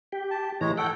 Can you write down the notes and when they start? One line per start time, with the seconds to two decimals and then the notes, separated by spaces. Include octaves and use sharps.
0.12 G4
0.31 A5
0.61 A2 E3 G#3 C#5 A#5
0.77 A4 F#5 G5